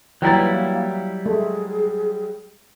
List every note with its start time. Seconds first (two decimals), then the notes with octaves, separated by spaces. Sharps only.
0.22 E3 F#3 G3 A#3 E4 G5 A#5 A6
1.26 G#3 A3 G#4